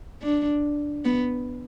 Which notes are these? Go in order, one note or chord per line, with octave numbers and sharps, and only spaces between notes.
D4
B3